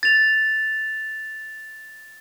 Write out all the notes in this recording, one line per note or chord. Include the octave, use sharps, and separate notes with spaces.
A6 F7